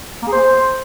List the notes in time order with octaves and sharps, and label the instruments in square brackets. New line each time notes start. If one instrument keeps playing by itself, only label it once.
[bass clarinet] A#3
G#4
C5